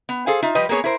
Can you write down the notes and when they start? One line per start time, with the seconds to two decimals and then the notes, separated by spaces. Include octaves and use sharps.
0.09 B3
0.27 G#4 A4 C5 F5
0.42 D#4 F4 E5
0.55 F3 G3 B4 D#5
0.69 A#3 B3 G#4 C#5
0.84 E4 A#4 C5